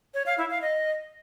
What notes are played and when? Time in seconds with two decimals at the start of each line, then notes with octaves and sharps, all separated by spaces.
0.14 C#5
0.26 F5
0.38 E4
0.50 F5
0.62 D#5